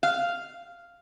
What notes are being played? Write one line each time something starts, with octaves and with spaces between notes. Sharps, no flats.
F5